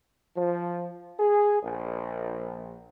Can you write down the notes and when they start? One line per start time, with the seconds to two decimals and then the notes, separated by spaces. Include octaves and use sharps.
0.36 F3
1.19 G#4
1.63 A#1